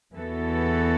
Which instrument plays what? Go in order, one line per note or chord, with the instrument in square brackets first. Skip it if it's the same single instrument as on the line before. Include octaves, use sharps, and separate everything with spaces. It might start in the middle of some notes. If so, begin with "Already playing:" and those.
[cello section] E2 E3 B3 F#4 A4